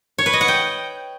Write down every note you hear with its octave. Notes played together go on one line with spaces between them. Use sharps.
C#5
B4
D#5
F#5
G5